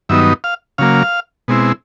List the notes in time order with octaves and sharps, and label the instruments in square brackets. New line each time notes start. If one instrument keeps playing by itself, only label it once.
[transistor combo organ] G2 D#3 F#3 B3 D#4 E5
F5
C#3 F#3 A#3 F5
B2 G#3 C4 E4